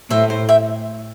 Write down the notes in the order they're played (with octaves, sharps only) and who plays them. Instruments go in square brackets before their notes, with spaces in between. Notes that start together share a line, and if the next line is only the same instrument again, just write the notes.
[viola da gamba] A2 [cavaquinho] C5 E5
[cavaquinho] C5
E5 G5